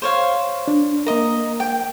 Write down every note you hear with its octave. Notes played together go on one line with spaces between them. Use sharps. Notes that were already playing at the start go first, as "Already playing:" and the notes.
C5 C#5 F5
D4
A#3 A#4 D#5 A#5
G5